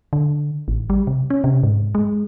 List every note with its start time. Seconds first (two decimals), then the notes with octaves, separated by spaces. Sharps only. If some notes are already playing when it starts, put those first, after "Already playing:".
0.13 D3
0.68 A1
0.90 G3
1.07 C3
1.30 C#4
1.44 C3
1.63 G#2
1.95 G#3